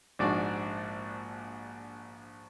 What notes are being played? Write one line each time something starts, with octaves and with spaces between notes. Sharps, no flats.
A#1 G#2 D4 F#4 D5